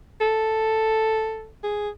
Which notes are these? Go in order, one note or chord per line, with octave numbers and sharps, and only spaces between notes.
A4
G#4